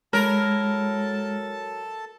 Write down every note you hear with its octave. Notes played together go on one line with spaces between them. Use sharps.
F#3 G#3 E4 A4 A#4 A5